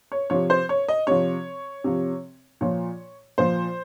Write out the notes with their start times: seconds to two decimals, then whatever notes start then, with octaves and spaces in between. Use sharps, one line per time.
0.12 C#5
0.30 C3 F3 C#5
0.50 C5
0.69 C#5
0.89 D#5
1.07 C3 F3 C#5
1.84 C3 F3
2.61 A#2 F3 C#5
3.38 A#2 F3 C5